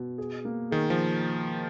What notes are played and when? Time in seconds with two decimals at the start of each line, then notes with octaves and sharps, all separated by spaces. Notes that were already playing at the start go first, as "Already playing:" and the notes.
Already playing: B2
0.18 G#4
0.45 A#3
0.71 D#3 G#4
0.90 F3